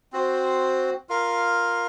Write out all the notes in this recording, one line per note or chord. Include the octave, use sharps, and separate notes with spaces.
C4 F#4 C5
F4 A#4 F5